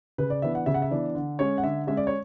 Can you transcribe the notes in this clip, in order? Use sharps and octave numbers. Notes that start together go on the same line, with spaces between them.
C#3 B4
D5
E3 B3 D4 E5
F#5
C#3 E5
F#5
E5
E3 B3 D4
D3
G#3 C#4 C#5
F#5
D3 E5
G#3 C#4 E5
D5
C#5